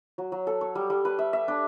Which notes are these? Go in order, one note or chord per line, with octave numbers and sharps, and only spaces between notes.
F#3
F#3
A4
C#5
G3
G3
B4
E5
E5
D4